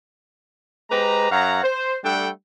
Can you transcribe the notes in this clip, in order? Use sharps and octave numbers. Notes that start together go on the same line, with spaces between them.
G#3 G4 B4 C5 A#5
F#2 C#5 F5 F#5 A#5
C5
G3 A3 D4 A4 F#5 G5